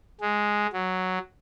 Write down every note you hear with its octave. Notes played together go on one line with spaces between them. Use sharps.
G#3
F#3